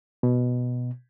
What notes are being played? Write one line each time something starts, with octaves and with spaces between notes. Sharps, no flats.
B2